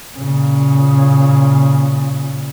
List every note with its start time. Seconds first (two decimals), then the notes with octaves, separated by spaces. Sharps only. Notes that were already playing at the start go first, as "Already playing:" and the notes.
0.18 A#2 C#3